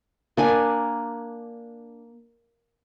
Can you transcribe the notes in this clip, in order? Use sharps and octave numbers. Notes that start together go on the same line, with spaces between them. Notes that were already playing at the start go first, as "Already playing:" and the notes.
A#3 D4 G#5